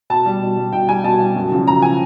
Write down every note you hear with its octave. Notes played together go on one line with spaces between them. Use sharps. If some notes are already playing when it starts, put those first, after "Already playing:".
B2 A5
G3
B2
G3
B2 G5
G3 G#5
B2 A5
G3
F#2
C#3 F3
F#2 A#5
C#3 F3 G#5